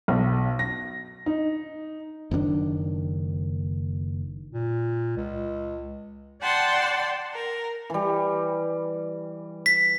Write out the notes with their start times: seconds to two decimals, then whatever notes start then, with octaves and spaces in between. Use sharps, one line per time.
0.08 B1
0.59 A#6
1.26 D#4
2.31 F#1 D#3 C#4 D4
4.53 A#2
5.17 C#2
6.42 D5 F#5 G5 A5 C6
7.34 A#4
7.90 E3 G3
9.66 B6